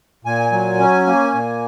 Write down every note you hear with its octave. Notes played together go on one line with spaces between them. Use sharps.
A#2 G#5
F#3
C#4
A#3
A#2